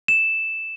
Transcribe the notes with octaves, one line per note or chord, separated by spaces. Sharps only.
E7